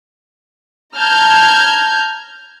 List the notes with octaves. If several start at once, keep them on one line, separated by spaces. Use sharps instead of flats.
A5 A#5 F6 G6 G#6